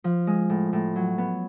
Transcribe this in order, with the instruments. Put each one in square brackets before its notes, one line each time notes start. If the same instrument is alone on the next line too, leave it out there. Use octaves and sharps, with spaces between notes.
[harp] F3
G#3
A2
A2
F#3
B3